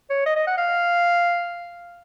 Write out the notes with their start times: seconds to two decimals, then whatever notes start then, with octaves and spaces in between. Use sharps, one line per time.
0.10 C#5
0.26 D#5
0.36 D#5
0.47 F#5
0.58 F5